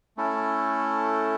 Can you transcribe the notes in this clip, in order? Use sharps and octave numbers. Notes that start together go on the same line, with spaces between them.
A3 C#4 E4 A4